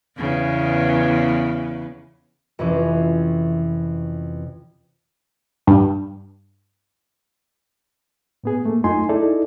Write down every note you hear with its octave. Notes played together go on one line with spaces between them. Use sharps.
E2 C#3 B3
F2 C3 E3 C#4
G2
A2 B3 G#4
A3 A#3
F#2 A3 D#4 F4 G#5 C6
D#4 E4 G#4 A4 D5